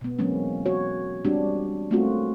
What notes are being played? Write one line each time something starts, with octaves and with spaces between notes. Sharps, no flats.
B2 B3
E3 F#3 G#3 A#3 C4 C#4
F#4 C#5
G3 G#3 C4 D4 F#4 G4
A3 A#3 C4 C#4 F4 F#4